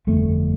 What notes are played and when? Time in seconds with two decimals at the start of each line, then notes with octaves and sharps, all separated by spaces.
0.07 G1 F2 D3 A3